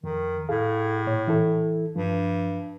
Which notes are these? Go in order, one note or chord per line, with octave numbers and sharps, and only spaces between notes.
F2 D#3
A2 G#4 A4 F5
A#2 C#5
E3 E4 A4
G2 F3